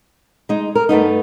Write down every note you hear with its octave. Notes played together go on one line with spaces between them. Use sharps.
G#3 D#4
A#4
G2 A3 B3 D#4